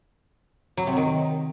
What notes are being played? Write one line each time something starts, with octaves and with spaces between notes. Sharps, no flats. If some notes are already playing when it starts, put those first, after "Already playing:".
F#3
C3
D#3